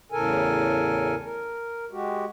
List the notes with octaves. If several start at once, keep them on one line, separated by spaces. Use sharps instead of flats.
E2 A2 C#3 A4 A#4 G#5
A#4
G#3 F#4 G4